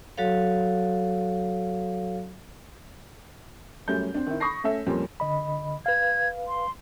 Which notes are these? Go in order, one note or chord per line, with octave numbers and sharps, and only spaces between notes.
F#3 F#4 A4 C#5 F5
F#2 F#3 G3 A3 C#4 G6
C4 D4
D#3 C4 E4
B5 C#6 D#6 A#6 C7
A3 C#4 A4 E5
F2 A#2 G3 C4 C#4
D3 D#5 B5
B4 F5 G#6
C6